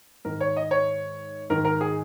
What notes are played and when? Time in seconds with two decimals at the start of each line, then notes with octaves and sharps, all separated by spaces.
0.25 G#2 D#3 A#4
0.40 C#5
0.57 D#5
0.71 C#5
1.50 G#2 D#3 A#4
1.65 A#4
1.81 G#4